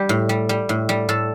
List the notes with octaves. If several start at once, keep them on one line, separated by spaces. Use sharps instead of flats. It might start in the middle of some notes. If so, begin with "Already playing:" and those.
Already playing: G3 G4
A2
G3
G3
A2
G3
A2 A4